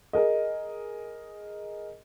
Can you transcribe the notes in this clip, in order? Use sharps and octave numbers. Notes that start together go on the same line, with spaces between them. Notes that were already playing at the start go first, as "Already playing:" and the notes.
G#4 A#4 D#5